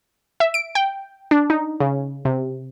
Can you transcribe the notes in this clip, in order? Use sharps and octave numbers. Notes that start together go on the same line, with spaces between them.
E5
D7
G5
D4
D#4
C#3
C3